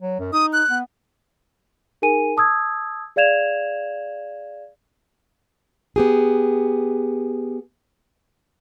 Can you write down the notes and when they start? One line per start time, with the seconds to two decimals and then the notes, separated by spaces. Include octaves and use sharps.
0.02 F#3
0.19 F#2
0.33 D#4 D#6
0.53 F#6
0.70 B3
2.02 D#4 G#4 A#4 G#5 D#7
2.37 A5 D#6 E6 G#6
3.16 G#4 D5 F5 G#6 E7 F7
5.96 B3 G4 G#4